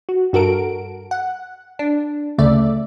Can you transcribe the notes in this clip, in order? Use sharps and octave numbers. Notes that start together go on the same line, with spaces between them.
F#4
G2 F#4 A4 A#4 D7
F#5
D4
D2 C#3 A3 D5 E5